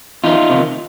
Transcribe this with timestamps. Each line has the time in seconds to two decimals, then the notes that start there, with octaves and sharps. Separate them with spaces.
0.24 E2 D#4 F4
0.50 C3 D#3